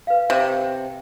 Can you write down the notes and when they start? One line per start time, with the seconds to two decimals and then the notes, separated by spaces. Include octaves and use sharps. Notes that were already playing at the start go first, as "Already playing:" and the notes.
0.07 B4 F5
0.30 C3
0.48 G5